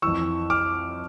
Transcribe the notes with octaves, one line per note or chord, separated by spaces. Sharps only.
F2 E3 C#6 E6
D6 F6